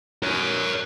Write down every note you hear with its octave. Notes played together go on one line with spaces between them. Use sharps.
A#4 C#5